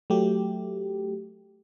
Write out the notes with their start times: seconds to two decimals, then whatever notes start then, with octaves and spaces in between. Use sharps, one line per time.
0.10 F#3 A3 G4